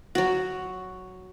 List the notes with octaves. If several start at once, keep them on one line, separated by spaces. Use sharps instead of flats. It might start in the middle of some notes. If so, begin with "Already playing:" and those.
F#3 F#4